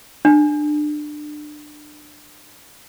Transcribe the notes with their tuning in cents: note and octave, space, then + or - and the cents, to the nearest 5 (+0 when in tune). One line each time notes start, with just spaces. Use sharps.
D4 +25